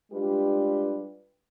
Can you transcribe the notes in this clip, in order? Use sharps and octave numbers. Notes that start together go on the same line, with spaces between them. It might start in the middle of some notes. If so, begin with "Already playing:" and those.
G3 G#3 D4 F4 G4 B4